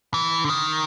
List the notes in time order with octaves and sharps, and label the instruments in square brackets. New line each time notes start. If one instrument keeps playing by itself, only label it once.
[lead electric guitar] E3
D3
D#3